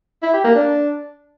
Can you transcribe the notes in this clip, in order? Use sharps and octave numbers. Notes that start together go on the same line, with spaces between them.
E4
G4
A#3
D4